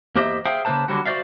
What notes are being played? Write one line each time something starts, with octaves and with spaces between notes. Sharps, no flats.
E2 A#3 G4 C5 D#5 E5
G#4 C5 E5 F5 G5
C#3 A#3 C#4 B4 C5 A5
D3 F#3 G3 F#4
F#4 C5 D5 E5 F5